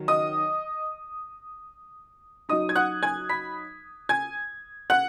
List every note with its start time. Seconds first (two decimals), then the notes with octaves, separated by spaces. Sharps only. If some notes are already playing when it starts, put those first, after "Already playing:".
Already playing: D#3 F#3
0.08 D#5 D#6
2.49 F#3 D#4 D#5 D#6
2.69 G#6
2.76 F#5 F#6
3.03 G#5 G#6
3.29 B5 B6
4.09 G#5 G#6
4.90 F#5 F#6